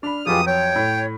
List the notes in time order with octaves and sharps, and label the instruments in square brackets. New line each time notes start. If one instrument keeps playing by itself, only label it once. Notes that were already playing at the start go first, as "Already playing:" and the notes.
[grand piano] D4 B5 [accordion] F6
[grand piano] F2 F#3 B4 [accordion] G#3 F4 G4 [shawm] D#6
[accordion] C#5 [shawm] G5
[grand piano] A2